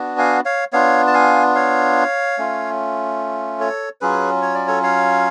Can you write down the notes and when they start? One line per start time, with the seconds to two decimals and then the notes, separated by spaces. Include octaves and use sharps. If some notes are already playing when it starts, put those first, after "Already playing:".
Already playing: B3 D4 F#4
0.18 F5 G#5
0.45 C#5 F5
0.73 B3 D4 F4 C#5 F5
1.07 A5
1.14 F5 G#5
1.55 C#5 F5
2.38 A3 C#4 F4
3.60 A4 C#5
4.01 F#3 C#4 F4 G#4 B4
4.42 C#5
4.55 D5
4.68 A4 C#5
4.83 C#5 F5